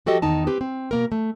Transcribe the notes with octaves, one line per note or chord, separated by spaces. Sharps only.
F3 F#4 G4 A4 D#5
E2 D#3 D#4 A5
C4 G4 B4
C4
B2 A#3 A#4
A3